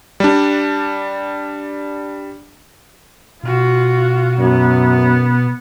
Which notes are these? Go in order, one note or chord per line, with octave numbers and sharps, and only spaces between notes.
G3 D4
B2 F4 F#4
F#2 B3